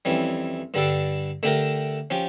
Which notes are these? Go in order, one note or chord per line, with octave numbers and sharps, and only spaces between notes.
F2 E3 G3 C#4
G2 D3 G3 D4 A4
D3 A3 D4 G4 A#4
F3 C#4 G4